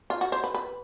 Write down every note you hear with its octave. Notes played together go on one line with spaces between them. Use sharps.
F4
F#4
C5
B4
B4